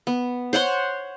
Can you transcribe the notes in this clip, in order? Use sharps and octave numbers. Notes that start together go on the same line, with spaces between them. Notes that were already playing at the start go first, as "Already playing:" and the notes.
B3
C5 C#5 F#5 C6